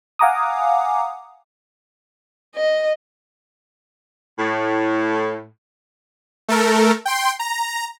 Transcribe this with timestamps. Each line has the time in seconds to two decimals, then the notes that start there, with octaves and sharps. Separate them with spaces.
0.19 F5 F#5 G#5 A#5 D6 D#6
2.57 D#5
4.39 A2
6.48 A3 A4 A#4
7.05 G5 C6
7.39 A#5